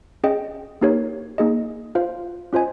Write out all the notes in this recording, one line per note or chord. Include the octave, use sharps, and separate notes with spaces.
C#4 G#4 D#5 G5
A#3 D#4 G4 A#4 C#5
A#3 D#4 G#4 D#5
F4 C5 F5
C#4 F4 C5 D#5 G#5